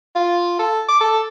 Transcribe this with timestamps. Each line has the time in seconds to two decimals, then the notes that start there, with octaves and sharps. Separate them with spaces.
0.16 F4
0.59 A4
0.88 D6
1.01 A4